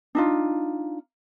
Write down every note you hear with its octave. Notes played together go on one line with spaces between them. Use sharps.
D4 D#4 F4